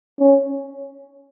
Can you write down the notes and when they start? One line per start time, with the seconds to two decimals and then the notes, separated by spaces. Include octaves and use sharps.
0.20 C#4